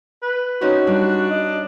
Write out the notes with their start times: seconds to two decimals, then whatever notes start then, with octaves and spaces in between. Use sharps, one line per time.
0.22 B4
0.61 C4 C#4 D#4 F#4
0.87 G2 D4
1.31 D#5